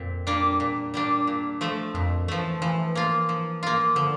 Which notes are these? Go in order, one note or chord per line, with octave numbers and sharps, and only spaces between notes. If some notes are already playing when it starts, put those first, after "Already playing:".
Already playing: F2 A#2 C4
G3 A#3 D4
E2 A#2
G3 A#3 D4
A#2
F3 A3
F2 A#2
E3 F3 A3
E3 F3
A#3 F4
F3
A#3 F4
D3 F3